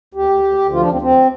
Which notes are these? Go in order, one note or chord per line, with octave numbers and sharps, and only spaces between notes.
D2 G4
D2
D2
D2
F3 F4
D4
D2 C4
D2 C4